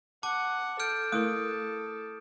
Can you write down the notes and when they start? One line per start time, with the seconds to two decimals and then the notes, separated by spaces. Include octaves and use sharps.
0.23 F#5 A5 D6
0.80 A4 F6 G6 D7
1.12 A3 E4 A#4 D#6